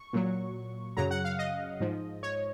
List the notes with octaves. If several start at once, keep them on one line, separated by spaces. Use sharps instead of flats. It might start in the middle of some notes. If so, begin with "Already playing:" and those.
Already playing: C#6
A#2 F#3
F#2 C#3 F#3 A#5
F#5
F5
D#5
G#2 F3
C#5